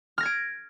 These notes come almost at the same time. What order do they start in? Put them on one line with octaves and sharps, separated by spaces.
F6 A#6 G#6 D7